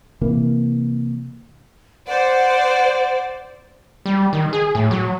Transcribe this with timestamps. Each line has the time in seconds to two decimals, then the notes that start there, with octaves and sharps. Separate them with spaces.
0.21 C3 E3 A#3
2.08 C5 D5 F#5
4.06 G3
4.33 D#3
4.53 G#4
4.75 A2
4.91 F#3